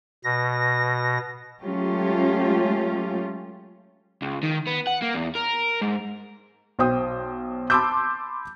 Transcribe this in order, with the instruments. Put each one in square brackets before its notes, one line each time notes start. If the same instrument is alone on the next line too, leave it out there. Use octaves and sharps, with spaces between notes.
[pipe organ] B2 A#6
[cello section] F#3 G#3 A3 C#4 F4 G4
[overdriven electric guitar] C#2
D#3
B3
F#5
A#3
E2
A#4
G#2
[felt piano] B1 C5 G5 D#6
A5 B5 C6 D6 E6 G6